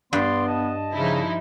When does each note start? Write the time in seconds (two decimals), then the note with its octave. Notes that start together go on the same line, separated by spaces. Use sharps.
0.13 G2 B3 D5 C6
0.48 D#5 A5
0.94 C#3 F3 D#4 E4